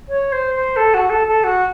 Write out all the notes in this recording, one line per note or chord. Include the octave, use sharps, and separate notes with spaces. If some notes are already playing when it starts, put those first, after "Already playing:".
C#5
C5
C5
A4
F#4
A4
A4
F#4